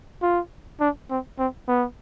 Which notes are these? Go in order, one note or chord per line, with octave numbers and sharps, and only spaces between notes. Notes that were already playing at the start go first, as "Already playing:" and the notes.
F4
D4
C4
C4
B3